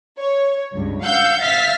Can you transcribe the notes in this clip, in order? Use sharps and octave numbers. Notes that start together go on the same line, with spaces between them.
C#5
C#2 G2
F5 F#5 E6 G6
E5 F5 F6 A6 B6